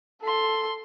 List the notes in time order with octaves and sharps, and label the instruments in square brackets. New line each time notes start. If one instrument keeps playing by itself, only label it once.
[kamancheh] A4 C6